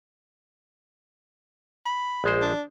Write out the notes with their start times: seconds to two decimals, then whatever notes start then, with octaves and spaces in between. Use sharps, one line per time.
1.86 B5
2.24 A#1 G#3 C5
2.42 D4